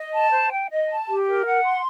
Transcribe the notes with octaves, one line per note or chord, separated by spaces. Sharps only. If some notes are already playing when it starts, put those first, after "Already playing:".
Already playing: D#5
A5
C5
G5
D#5
A5
G4
A#4
F#5
C6